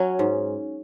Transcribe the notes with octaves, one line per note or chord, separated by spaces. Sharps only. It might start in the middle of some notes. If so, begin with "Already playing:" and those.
Already playing: F#3 C#4
G#2